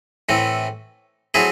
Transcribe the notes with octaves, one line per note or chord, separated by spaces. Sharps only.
A2 E3 A3 C4
F#3 A3 C4 E4 G#4